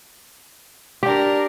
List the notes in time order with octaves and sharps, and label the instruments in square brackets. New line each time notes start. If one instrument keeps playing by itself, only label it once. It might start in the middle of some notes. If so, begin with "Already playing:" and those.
[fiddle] D4 A#4 [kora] G4